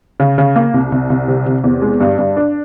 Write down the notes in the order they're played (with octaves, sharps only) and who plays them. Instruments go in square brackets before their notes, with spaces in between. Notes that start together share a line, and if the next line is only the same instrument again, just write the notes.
[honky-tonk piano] C#3
C#3
A#3
C2
C2
C2
C3
C3
E2
G#3
G2
G2
D4